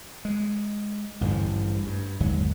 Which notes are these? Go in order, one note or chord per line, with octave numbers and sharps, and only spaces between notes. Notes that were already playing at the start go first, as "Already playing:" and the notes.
G#3
A1 G2 D3 F3
G2
G1 D#2 G#2 F#3